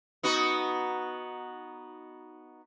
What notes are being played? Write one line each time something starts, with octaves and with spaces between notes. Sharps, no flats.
B3 D#4 F#4